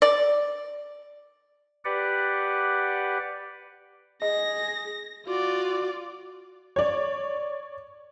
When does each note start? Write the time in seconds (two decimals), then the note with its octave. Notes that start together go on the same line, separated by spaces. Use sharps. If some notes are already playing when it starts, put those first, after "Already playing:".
0.02 D5
1.85 G4 B4 D5 F#5
4.22 G#4 D#5 A#6
5.26 F4 F#4 D5
6.76 C#5 D5